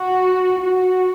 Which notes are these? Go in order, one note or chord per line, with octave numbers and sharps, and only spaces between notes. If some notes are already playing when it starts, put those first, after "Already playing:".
Already playing: F#4
F#4